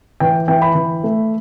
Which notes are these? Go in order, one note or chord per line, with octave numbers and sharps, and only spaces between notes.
E3 G5
E3 G5
B5
E3
A3